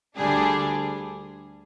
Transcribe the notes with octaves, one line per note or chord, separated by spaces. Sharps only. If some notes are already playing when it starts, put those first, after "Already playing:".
D2 D3 G3 D4 G#4